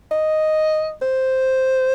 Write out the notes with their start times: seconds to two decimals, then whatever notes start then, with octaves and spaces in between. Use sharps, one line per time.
0.11 D#5
1.02 C5